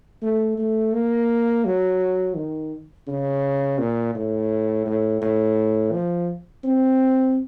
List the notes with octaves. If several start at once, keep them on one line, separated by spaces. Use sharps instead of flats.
A3
A3
A#3
F#3
D#3
C#3
A#2
A2
A2
A2
F3
C4